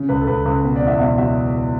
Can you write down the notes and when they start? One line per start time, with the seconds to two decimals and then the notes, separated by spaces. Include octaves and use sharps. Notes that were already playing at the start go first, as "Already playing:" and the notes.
Already playing: C#3
0.09 C#2 B4
0.21 A4
0.27 C#2 B4
0.46 C#2
0.64 B2 B4
0.76 D5
0.82 E2
0.88 E5
1.00 B2 E5
1.18 F#3 E5